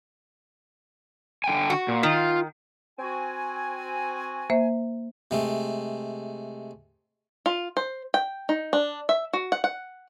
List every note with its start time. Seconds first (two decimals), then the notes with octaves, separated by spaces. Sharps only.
1.44 D3 G5 G#5
1.70 F#4
1.88 A#2
2.03 D#3 F4
2.99 C4 F#4 G#5
4.50 A#3 C5 E5
5.31 C3 G#3 A3
7.46 F4
7.77 C5
8.14 G5
8.49 D#4
8.73 D4
9.09 E5
9.33 F#4
9.52 F#5
9.64 F#5